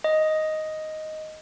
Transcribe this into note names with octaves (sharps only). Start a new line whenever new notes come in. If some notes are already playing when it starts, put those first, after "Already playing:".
D#5